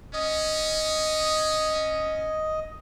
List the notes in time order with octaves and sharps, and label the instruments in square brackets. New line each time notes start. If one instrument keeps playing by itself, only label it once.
[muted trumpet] C#4 [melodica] D#5